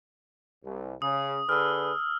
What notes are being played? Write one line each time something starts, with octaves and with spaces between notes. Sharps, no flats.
C2
C#3 D#6
D3 G#4 B4 E6 F6